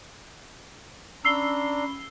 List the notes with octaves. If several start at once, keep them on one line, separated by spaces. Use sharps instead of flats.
C#4 D4 A#5 B5 E6 C7 G7